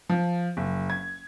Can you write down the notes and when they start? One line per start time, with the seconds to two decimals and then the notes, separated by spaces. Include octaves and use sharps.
0.09 F3
0.57 F#1
0.90 G#6